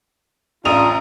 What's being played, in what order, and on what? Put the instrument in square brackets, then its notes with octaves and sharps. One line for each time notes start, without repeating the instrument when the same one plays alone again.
[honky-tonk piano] A1 F7 [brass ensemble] C#3 D4 F4 [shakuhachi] A#5 [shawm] D#6